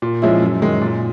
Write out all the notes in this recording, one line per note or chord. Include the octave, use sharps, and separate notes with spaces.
A#2
F3 G#3 C#4 E4
F#2
D#3 G#3
A#2